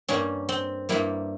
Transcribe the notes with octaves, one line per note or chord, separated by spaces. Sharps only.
G2 G3 A#3 C#4
C4
G2 G3 A#3 E4